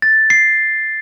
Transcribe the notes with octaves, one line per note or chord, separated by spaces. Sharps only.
A6
C7